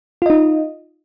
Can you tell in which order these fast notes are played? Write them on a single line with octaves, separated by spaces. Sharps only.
F4 D#5 D#4